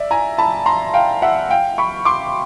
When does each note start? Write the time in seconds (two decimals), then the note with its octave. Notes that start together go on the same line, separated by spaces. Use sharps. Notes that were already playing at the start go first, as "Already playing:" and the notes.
Already playing: D5 E5
0.11 G#5 A#5
0.38 A5 B5
0.66 A#5 C6
0.94 F5 G5
1.22 E5 F#5
1.51 F5 G5
1.78 B5 C#6
2.05 C6 D6